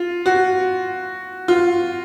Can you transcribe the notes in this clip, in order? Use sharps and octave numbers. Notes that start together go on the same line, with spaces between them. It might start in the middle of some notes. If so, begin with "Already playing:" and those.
Already playing: F4
F#4
F4